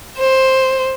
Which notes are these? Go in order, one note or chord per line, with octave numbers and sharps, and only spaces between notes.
C5